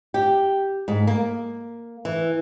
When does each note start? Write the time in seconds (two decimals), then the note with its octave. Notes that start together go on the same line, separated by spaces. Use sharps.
0.14 G4
0.88 G#2
1.07 A#3
2.05 E3